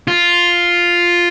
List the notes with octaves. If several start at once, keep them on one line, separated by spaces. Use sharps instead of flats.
F4